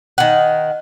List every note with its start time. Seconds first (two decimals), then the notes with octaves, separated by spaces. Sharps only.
0.18 D#3 F#5